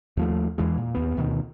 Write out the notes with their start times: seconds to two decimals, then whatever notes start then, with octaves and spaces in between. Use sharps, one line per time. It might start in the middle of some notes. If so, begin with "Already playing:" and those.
0.17 D#2 F3 A3
0.58 E2 E3 G#3
0.78 A#2
0.95 D#2 B3
1.17 D2 B2 D#3